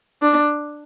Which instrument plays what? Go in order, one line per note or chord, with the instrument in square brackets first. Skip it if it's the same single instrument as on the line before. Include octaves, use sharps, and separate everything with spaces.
[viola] D4